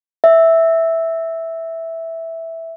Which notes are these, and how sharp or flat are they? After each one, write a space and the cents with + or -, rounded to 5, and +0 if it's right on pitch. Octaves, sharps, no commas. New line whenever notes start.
E5 -5